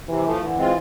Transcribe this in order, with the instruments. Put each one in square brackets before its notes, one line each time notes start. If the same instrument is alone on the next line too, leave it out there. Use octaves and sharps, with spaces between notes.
[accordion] C3 [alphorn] E3
[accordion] F3 A3
[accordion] D3 [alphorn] E3
[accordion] G#3 C4 F4